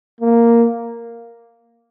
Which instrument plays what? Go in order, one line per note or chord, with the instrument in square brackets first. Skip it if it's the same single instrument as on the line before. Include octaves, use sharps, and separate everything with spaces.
[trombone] A#3